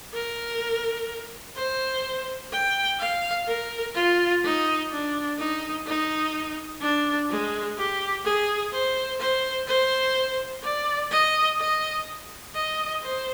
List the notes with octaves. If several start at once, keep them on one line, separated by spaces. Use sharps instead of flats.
A#4
C5
G5
F5
A#4
F4
D#4
D4
D#4
D#4
D4
G#3
G4
G#4
C5
C5
C5
D5
D#5
D#5
D#5
C5